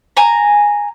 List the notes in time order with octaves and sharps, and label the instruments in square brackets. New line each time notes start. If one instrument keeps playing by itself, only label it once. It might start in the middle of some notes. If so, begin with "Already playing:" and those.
[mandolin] G#5 A#5